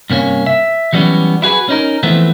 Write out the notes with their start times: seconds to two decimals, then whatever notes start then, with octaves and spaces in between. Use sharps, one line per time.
0.10 G2 C3 A#3 C#4
0.46 E5
0.93 E3 F#3 G3 B3 C#4
1.42 E4 F#4 G#4 B4
1.69 C#4 D#4 A#4
2.03 E3 F3 A3 B3 C4